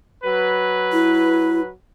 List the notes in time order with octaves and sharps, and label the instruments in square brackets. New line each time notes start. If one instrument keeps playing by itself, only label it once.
[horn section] F#3 B4
[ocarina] E4